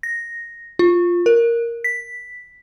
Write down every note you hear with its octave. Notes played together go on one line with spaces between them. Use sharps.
A#6
F4
A#4
B6